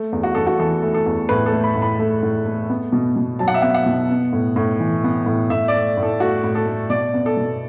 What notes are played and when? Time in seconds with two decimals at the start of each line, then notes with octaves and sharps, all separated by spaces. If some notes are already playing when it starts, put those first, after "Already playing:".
Already playing: A3
0.12 E2
0.23 F#4
0.35 E2 A4
0.47 F#4
0.59 E3 A4
0.83 A3
0.94 A4
1.06 E2
1.29 A2 B4
1.46 A4
1.53 A3
1.64 B5
1.76 A2
1.82 B5
1.99 A3
2.23 A2
2.46 A3
2.70 B3
2.92 B2
3.16 B2
3.39 F#3 A5
3.48 F#5
3.54 E5
3.62 B3 F#5
3.74 F#5
3.86 B2
4.10 B3
4.33 A2
4.56 A2
4.80 E3
5.04 B3
5.26 A2
5.50 A2 E5
5.68 D5
5.73 A3
5.97 A2
6.03 A4
6.20 A3 F#4
6.44 A2
6.55 A4
6.66 A3
6.90 B2 D5
7.14 B3
7.26 A4
7.37 B2